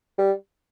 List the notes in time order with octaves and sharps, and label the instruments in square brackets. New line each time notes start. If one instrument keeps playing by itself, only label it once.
[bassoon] G3